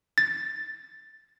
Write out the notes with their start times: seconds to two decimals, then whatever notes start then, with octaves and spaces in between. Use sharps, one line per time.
0.18 A6